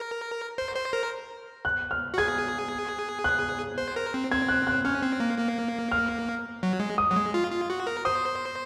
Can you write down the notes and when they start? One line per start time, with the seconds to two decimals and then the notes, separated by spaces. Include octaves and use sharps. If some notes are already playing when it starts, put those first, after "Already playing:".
Already playing: A#4
0.58 C5
0.75 C5
0.93 A#4
1.65 F#6
1.91 F6
2.14 F#4
2.18 G#4 G#6
3.24 F#6
3.78 C5
3.96 A#4
4.14 C4
4.32 C4 G#6
4.48 F#6
4.67 F#6
4.85 C#4 F6
5.02 C4
5.20 A#3
5.38 A#3
5.92 F6
6.63 F#3
6.80 G#3
6.98 D#6
7.11 F#3
7.16 G#3
7.34 F4
7.51 F4
7.70 F#4
7.87 A#4
8.05 C5 D#6